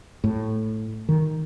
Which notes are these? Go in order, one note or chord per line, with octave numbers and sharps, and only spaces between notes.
A2
D#3